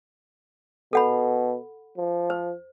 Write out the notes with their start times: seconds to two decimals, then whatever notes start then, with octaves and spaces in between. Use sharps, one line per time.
0.93 B2 A4 F#5 B5
1.97 F3
2.30 C5